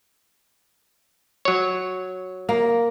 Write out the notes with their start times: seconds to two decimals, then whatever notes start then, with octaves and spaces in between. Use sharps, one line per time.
1.45 F#3 C#5
2.49 A#3